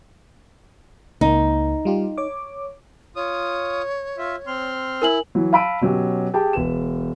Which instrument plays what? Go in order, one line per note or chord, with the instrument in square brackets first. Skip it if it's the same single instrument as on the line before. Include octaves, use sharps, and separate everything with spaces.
[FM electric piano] C#2 A#3 [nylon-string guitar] D#4
[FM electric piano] G3 F4 G4
C#5 D6
[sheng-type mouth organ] F4 D#6 [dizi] C#5
[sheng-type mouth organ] F4 E5
C4 C6 F6
[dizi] E4 [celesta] A#4 G#5 F#7
[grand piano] E3 F#3
F5 A5 B5 E6 D7 D#7
B2 F#3 C#4 G4
G4 G#4 G5 A5
E1 B4 E7